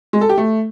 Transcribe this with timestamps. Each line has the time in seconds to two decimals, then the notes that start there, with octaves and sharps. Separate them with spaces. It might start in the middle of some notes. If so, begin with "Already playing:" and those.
0.13 G#3
0.21 A4
0.29 G4
0.38 A3